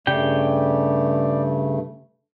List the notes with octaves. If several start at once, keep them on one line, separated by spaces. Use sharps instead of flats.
G2 C#3 A3 G4 D5 G5